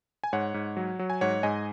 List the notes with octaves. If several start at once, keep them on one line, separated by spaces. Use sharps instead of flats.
G#5
G#2 C#5 F#5
G#2
F#3
F#3
G#5
G#2 C#5 F#5
G#2 D#5 G#5